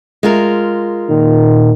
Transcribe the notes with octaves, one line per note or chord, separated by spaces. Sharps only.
G#3 F4 A#4
A#2 D#3